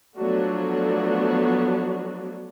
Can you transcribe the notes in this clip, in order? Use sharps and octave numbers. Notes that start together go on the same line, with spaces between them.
F3 F#3 A3 B3 D4 F#4